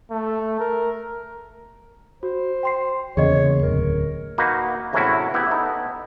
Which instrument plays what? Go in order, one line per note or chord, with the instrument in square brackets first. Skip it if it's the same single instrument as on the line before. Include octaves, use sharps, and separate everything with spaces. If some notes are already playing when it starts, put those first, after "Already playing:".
[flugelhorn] A3
A#4
[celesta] F#4 [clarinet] C5
[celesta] G5 C6 C7
[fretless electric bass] E2 C#3 A#3 [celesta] G#4 D#5 [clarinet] C#5
[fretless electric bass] D1 [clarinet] A#4
[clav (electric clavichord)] A#3 D#4 F#4 B4
E2 A2 C3 C#4 E4 F#4
B3 E4 G4
B3 D#4 A4